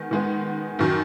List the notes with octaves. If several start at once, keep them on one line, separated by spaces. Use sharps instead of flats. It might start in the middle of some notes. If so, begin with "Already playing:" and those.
Already playing: D#3 G#3 B3
D#3 G#3 B3
F#2 D#3 F#3